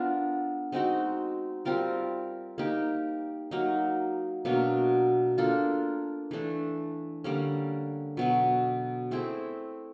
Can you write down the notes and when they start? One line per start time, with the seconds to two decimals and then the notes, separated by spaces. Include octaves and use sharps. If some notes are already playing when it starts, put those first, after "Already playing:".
Already playing: B3 D4 F4 A#4
0.72 G#3 C4 D#4 F#4
1.65 G3 C4 F4 A#4
2.58 A#3 D#4 G4
3.51 F#3 A#3 D#4
4.45 B2 F#3 A#3 D4
5.38 A#3 D4 F4 A4
6.31 E3 A3 D4
7.24 D3 G3 A#3 C#4
8.17 B2 F#3 B3
9.11 A3 C4 E4 G#4